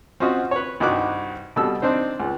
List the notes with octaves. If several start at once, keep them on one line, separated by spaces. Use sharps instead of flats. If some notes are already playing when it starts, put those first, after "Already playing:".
C4 C#4 F4 F#4 D#5
B4 C#5
C2 G2 D#4 F#4 D6 F#6
B2 G3 A4 E6
C4 D4 D#4 C5
C#2